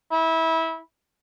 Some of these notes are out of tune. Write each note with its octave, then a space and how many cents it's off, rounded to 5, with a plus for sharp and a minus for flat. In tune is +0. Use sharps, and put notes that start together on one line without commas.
E4 -20